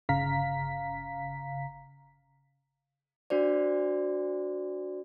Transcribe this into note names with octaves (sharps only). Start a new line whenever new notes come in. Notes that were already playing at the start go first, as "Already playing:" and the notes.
G1 C#3 F5 A#5 B6
D4 F#4 C5 D5